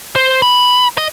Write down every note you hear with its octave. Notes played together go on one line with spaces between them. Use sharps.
C5
B5
D#5